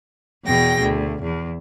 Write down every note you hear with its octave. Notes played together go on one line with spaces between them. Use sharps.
E2 B2 G#4 G5 A#6
D2
E2